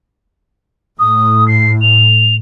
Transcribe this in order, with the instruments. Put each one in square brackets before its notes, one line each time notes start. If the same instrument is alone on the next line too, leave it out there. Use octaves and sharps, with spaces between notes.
[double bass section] A2 [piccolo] D#6
[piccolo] C7
F7